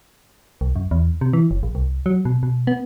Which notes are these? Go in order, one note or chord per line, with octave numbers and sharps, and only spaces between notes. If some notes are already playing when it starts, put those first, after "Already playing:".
C2
F#2
E2
C3
E3
F#1
A#1
C2
F#3
B2
B2
B3